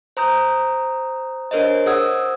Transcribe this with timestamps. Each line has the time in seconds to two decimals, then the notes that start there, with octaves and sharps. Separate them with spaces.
0.17 C5 A#5 D#6 G6
1.51 D4 A#4 C5 C#5 D#5
1.86 G#4 C5 F#5 D#6 E6 G#6